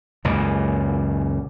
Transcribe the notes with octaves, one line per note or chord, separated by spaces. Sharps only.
C#2 F#2 A#2